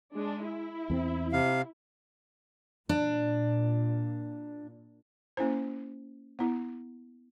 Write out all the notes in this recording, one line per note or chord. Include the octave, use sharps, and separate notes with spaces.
G#3 D4
E4
E2 B3 C4
C3 F5
A#2 D4
A#3 C#4 E4 C5
B3 E4